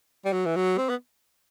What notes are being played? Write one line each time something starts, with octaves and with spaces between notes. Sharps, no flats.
G3
F#3
E3
F#3
C4
B3